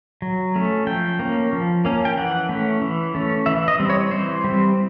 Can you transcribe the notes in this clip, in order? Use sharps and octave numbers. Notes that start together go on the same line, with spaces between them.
F#3
A3 C#4
F3 G5
A#3 C#4
F3
A#3 C#4
G5
E3 F#5
A3 C#4
E3
A3 C#4
E3 E5
D#5
G3 C4
C#5
E3 C5
G3 C4